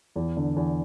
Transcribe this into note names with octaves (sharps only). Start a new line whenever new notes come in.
E2
D3
E2